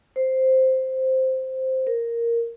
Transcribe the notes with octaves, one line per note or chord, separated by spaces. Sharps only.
C5
A#4